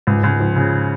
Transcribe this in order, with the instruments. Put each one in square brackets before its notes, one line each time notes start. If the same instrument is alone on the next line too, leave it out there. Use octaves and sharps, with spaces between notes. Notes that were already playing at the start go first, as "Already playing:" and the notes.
[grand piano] C#2 [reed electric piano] G#2
[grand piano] C#2
F3
C#3